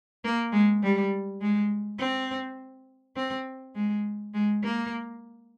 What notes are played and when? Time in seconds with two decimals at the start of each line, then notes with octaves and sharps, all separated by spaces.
0.24 A#3
0.52 G#3
0.83 G3
1.41 G#3
1.99 C4
3.16 C4
3.75 G#3
4.34 G#3
4.63 A#3